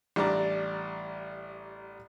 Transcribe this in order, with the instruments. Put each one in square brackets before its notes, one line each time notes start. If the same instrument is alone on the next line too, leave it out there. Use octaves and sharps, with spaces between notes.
[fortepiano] A1 G3 D4 D5 A#5